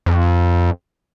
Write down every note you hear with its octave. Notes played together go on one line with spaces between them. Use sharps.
F2